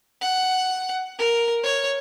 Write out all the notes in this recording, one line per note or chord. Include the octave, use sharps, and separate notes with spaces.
F#5
A#4
C#5